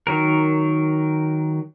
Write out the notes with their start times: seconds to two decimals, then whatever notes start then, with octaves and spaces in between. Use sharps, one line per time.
0.07 D#3 F#3 A#4